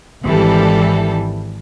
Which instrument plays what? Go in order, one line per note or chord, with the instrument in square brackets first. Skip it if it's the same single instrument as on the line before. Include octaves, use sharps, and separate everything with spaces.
[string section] G#1 E3 G3 A4